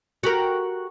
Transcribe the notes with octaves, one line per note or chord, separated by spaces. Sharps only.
F#4 G4 A#4